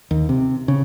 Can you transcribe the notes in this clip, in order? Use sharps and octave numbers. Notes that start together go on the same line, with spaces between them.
D#2
C3
C#3